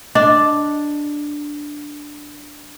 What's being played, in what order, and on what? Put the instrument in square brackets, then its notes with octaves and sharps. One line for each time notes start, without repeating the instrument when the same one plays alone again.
[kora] D4 [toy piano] D#5